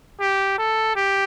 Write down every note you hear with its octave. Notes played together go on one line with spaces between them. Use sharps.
G4
A4
G4